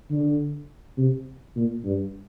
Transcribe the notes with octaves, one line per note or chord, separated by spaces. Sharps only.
D3
C3
A#2
G2